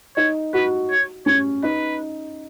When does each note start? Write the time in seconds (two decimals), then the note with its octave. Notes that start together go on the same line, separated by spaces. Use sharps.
0.16 D#4 C#5
0.53 F#4 B4
0.91 C#5
1.26 C#4 C#5
1.63 D#4 B4